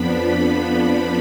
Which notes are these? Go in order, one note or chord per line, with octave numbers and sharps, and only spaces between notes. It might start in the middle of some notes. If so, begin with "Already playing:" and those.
Already playing: F2 F3 B3 D4 B5
B5